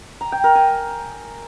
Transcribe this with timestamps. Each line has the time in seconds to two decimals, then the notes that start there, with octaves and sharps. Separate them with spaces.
0.21 A#5
0.32 G5
0.44 A#4
0.55 G#5